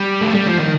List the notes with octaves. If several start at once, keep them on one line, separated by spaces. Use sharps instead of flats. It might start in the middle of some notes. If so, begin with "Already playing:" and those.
Already playing: G3
A3
G3
F3
D#3